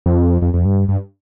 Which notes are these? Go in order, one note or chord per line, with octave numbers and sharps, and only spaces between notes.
F2
F2
F2
G2
G2